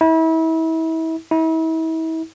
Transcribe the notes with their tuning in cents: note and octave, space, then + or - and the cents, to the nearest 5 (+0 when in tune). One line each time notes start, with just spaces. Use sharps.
E4 -35
E4 -40